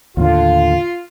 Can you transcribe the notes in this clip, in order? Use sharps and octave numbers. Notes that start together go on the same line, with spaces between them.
D#2 A2 D3 F4